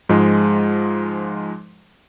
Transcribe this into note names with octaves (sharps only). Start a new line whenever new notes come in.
G#2 F3 G#3